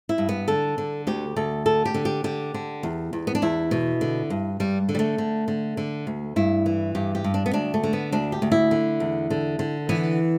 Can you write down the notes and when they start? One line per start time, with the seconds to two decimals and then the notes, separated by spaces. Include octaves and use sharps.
0.09 E4
0.18 G2
0.29 B3
0.48 D3 A4
0.78 D3
1.07 D2 G4
1.36 D2 A4
1.65 D3 A4
1.85 G4
1.94 D3
2.05 G4
2.24 D3 G4
2.54 D3
2.83 E2
3.13 E2
3.27 B3
3.35 D4
3.42 E2 E4
3.71 B2
4.01 D3
4.30 G2
4.60 G2 G3
4.89 D3
4.95 G3
4.99 A3
5.18 D3
5.48 D3
5.77 D3
6.07 D2
6.36 G2 E4
6.66 E3
6.95 G2 G4
7.15 G4
7.24 G2
7.34 D4
7.46 B3
7.53 D2 D4
7.74 A3
7.83 D3
7.93 B3
8.12 D2 D4
8.32 G4
8.42 D2
8.52 E4
8.71 D3
9.00 E2
9.30 D3
9.59 D3
9.89 E3 B3